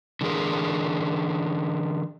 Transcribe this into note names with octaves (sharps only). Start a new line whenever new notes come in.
D3 E3 G#4 A#4